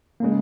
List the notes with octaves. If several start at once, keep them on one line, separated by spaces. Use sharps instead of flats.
C#3 G#3 A#3